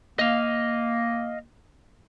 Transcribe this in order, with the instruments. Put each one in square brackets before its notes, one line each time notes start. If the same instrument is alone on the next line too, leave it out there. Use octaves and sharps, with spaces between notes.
[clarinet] A#3 [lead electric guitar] D#5 F5